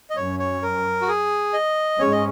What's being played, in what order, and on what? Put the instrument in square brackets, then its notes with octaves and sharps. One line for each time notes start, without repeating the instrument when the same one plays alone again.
[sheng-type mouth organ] D#5
[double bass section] F#2 F#3 C#4 [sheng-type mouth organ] C#5
[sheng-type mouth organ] C#5
A#4
F#4
G#4
D#5
[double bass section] G#2 G#3 C#4 [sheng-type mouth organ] C#5
[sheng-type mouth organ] D#5